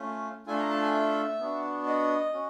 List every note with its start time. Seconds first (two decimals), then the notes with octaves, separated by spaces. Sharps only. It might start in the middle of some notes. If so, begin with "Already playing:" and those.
Already playing: A3 C#4 F4
0.46 A3 D4 F4 A4 G#5
0.59 A#5
0.70 A5
0.82 G#5
0.93 E5
1.40 B3 D4 F#4
1.86 D#5
2.33 C#4 F#4